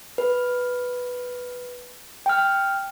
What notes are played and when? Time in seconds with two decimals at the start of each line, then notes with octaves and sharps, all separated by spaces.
0.18 B4
2.26 G5 F6